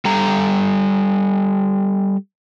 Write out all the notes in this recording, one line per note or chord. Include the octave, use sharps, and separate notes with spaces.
G3 A4 A#5